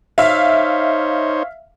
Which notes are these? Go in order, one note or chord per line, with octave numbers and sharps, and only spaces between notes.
D#4 C5 C#5 E5 F5